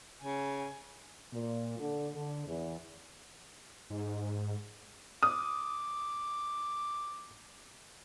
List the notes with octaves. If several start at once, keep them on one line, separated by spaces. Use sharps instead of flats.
C#3 G#5
A#2
D3
D3
E2
G#2
D6 D#6